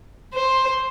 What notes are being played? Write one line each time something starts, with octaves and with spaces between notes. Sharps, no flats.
C5